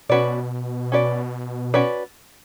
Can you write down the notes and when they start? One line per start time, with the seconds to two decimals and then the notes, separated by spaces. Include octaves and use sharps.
0.09 B2 C#4 F#4 B4 D5
0.92 C#4 F#4 B4 D5
1.74 C#4 F#4 B4 D5